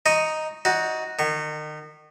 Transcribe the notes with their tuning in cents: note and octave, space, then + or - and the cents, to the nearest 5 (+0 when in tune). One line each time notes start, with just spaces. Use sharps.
D#4 +0 D#5 +0 C#6 +5
D#4 +20 F#4 +0 D5 +0
D#3 -35 C#6 +0